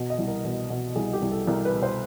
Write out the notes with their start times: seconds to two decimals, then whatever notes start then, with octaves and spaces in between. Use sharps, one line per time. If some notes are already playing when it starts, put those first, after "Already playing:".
Already playing: B2
0.10 D#5
0.19 C2
0.27 A#4
0.45 B2
0.70 B2
0.96 C2 G#4
1.13 G4
1.22 C2
1.31 A4
1.47 C2 A#4
1.65 B4
1.74 B2
1.82 C5